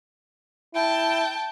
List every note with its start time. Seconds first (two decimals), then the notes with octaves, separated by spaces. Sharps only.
0.75 E4 G5 A5